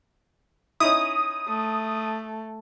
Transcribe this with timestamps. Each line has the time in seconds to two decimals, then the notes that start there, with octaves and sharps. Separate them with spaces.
0.80 C#4 D#4 E4 D#6
1.48 A3